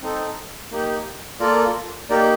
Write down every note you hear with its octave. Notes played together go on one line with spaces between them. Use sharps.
C4 D#4 A4
A#3 D#4 G4
A#3 F4 A4 A#4 D5
A#3 D#4 G4 A#4 D5